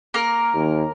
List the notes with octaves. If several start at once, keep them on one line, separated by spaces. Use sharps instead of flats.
A#3 A#4
D#2